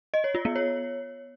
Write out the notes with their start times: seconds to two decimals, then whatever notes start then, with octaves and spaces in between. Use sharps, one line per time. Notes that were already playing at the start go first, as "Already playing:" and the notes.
0.14 D#5
0.24 C#5
0.35 F4
0.45 B3
0.56 C#5